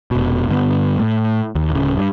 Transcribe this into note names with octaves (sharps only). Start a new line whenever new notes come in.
F1 B2
G2 D3 B3
A2
D#2
D1 C#3
G2